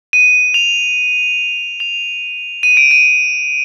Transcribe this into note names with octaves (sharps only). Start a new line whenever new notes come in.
D#7
F7
F7
D#7
D7
D#7